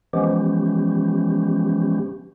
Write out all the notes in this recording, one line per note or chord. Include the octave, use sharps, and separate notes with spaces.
E3 F3 G#3 B3 C#4 G4